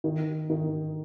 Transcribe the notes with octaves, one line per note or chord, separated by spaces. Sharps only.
D#3
D#3